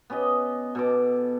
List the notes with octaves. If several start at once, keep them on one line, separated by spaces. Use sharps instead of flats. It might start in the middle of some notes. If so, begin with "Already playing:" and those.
B3 C#4 G4 D#5
B2 A4 D6